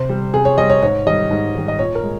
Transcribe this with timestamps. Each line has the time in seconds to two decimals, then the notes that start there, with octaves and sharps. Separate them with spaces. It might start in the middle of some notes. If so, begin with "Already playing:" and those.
Already playing: C3 C5
0.09 G3
0.34 C3 G#4
0.45 C#5
0.58 G3 D#5
0.70 C#5
0.82 G#2 C#5
1.06 D#3 G3 D#5
1.31 G#2
1.55 D#3 G3
1.68 D#5
1.79 A#2 C#5
1.95 A#4
2.03 G#3